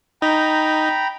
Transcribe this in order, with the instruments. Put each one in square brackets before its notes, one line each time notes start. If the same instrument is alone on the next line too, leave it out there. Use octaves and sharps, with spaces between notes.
[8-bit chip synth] D#4 [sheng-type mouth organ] G5 A#5 B5